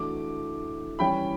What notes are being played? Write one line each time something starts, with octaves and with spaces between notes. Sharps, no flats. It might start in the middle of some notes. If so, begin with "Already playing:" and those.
Already playing: E3 A3 D4 F#4 D6
E3 G3 C#4 G5 B5